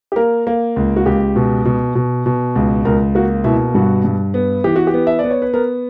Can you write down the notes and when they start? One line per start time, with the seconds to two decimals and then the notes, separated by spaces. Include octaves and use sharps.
0.12 G4
0.16 A#3 A#4
0.47 A#3
0.76 C#2
0.96 F#4
1.06 C#2 G4
1.36 B2
1.65 B2
1.95 B2
2.26 B2
2.56 C#2
2.85 C#2 A#4
3.15 A#3 F#4
3.44 B2 E4
3.75 G2 F#4
4.04 G2
4.34 B3
4.64 E3 G4
4.76 F#4
4.87 G4
4.94 B3
5.07 E5
5.19 B3 D5
5.31 C#5
5.42 B4
5.54 B3 A#4